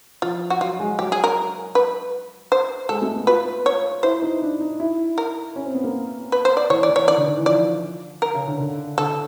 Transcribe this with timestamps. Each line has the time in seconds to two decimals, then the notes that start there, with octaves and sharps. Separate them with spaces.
0.22 F3 F4
0.50 F#4
0.61 F#3 F4
0.79 G#3
0.99 F#3 G4
1.12 G#4
1.24 A#4
1.75 B4
2.52 C5
2.89 G#3 A4
3.02 A3
3.14 B3
3.27 F4 B4
3.66 C#5
4.03 E4 C5
4.22 D#4
4.42 D4
4.61 D#4
4.80 E4
5.18 A#4
5.56 C#4
5.65 C4
5.74 B3
5.84 A#3
6.32 B4
6.45 C5
6.57 D5
6.70 E3 C#5
6.83 D5
6.89 E3
6.96 C#5
7.08 D#3 D5
7.17 D3
7.27 D#3
7.37 E3
7.46 F3 D5
8.22 A#4
8.34 C#3
8.47 D3
8.60 D3
8.98 D3 A4